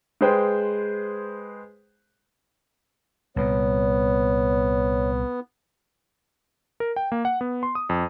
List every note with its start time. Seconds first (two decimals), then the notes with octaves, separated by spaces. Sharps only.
0.21 G#3 G#4 B4 C5 G5
3.36 C2 A#2 B3 C#5
6.80 A#4
6.96 G5
7.12 A#3
7.25 F#5
7.41 B3
7.63 C6
7.75 D#6
7.89 F2